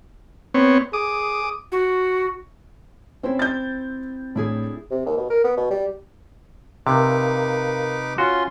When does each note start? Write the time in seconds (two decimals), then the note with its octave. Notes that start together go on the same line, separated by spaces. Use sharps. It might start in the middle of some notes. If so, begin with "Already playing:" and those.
0.54 B3 C4 C#5
0.93 G#4 D6 D#6
1.72 F#4
3.23 C4 C#4 E4 C5
3.39 G6 A6
4.35 A2 D4 E4 G#4
4.91 C3
5.06 D#2
5.17 B2
5.30 A#4
5.44 B3
5.57 B2
5.70 G3
6.87 C3 D#4 A#4 B4 F5 D6
8.18 C#4 F4 F#4 C6